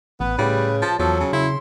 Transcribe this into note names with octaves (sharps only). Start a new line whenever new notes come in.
A1 B3 B4
A2 C#3 G3
F3 A5
E2 F3 F#3 A4
C#3
C#3 E4 C6